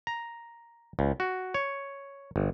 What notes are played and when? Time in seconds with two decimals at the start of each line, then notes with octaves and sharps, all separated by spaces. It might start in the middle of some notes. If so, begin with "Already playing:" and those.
0.07 A#5
0.99 C#2
1.20 F#4
1.54 C#5
2.36 G1